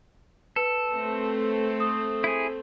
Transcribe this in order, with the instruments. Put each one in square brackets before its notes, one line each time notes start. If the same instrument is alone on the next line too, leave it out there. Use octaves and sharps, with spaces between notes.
[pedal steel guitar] A4 [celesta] B4
[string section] A3 C4
[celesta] D#6
[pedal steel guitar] E4 G#4